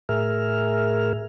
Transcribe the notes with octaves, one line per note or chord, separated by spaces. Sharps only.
A2 G#4 A#4 E5 F6